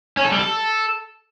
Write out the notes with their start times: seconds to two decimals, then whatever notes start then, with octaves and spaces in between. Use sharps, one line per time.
0.17 C#4
0.24 A4
0.31 G3
0.39 A4